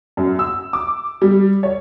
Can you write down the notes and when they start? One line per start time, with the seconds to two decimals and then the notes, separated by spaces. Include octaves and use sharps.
0.17 F#2
0.39 E6
0.73 D6
1.22 G3
1.63 C#5